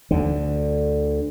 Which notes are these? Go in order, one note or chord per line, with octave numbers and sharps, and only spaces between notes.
D2 D3